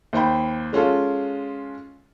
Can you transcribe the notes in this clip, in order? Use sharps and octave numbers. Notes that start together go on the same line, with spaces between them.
D#2 C5 G5 B5
G#3 C#4 F4 A4